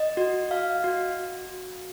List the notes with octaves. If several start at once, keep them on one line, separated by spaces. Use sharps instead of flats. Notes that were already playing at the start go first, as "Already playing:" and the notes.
Already playing: D#5
F#4
F5
F#4